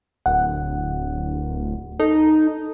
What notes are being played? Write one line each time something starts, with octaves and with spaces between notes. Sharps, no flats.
D1 F#5
D#4 A4